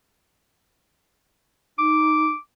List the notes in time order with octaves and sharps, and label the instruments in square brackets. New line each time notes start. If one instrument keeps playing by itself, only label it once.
[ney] D#4 [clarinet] D6